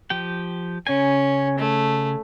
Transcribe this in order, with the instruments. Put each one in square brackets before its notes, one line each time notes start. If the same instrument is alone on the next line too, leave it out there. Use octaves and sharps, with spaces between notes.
[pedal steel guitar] F3 G4 G5
[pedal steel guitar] C#3 G#5 [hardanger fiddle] C#4
[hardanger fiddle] A3